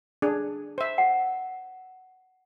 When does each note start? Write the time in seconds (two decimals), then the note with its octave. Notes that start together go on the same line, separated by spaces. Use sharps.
0.22 D4 G#4
0.78 C5 E5
0.98 F#5